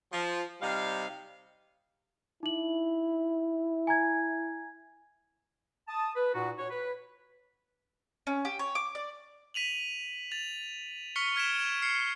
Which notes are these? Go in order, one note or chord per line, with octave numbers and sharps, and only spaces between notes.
F3
C3 G3 D#4 F5
D#4 E4 F#7
G#5 A#5 G#6
A5 D#6
B4
A#2 D#4 F#4
F#4 C#5
B4
C#4
G4
C#5
D6
D5
B6 D#7 F7 F#7
A6 F7
C#6 F6 B6 C#7 G7
F6 G#6 B6 D7 E7
G#6
F6 C7 C#7